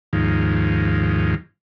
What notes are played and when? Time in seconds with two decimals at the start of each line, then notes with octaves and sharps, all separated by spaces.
0.13 D#2 G#2 F3